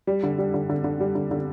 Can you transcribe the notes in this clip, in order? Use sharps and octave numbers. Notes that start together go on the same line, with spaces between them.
G3
D3
G3
D3
D3
D3
G3
D3
D3